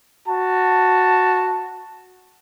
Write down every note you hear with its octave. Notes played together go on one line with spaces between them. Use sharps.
F#4 A5